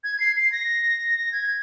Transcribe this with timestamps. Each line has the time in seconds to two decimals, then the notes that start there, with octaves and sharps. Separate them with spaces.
0.04 G#6
0.20 C7
0.36 C7
0.52 A#6
1.32 G#6